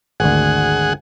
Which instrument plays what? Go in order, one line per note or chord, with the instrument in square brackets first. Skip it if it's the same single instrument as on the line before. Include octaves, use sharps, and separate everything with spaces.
[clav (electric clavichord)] G#1 D2 [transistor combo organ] G#4 F#5